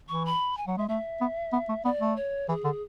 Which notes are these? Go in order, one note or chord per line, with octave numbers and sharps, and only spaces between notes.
E3 C#6
B5
G#5
F#3 F#5
G#3 E5
A3 E5
B3
B3
A3
B3 D5
A3
C#5
E3 G#4
D3